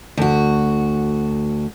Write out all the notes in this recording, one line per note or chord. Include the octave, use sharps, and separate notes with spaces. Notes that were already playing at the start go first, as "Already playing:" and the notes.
D2 F#4